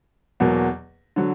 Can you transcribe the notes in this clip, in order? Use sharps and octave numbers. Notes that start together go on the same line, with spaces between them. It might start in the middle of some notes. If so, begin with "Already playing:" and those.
E2 B2 F#3 A#3
D3 F#3